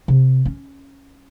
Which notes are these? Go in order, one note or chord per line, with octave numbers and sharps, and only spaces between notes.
C3
C#4